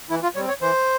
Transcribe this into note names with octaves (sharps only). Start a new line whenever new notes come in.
E3 E4
F4
G3 C4 C#5
C#5
E3 C5